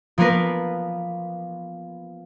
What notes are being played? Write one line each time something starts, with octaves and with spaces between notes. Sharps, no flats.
F3 A#3 B3 A#4 B4